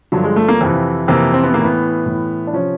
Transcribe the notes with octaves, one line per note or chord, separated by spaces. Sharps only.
G2 D3 F3 F#3
G#3
A3
A#3
F2 C3 E3
F2 C3 E3 A#3
C4
B3
A2 E3 A#3
B3
A2 E3
D4
C3 F3 C#4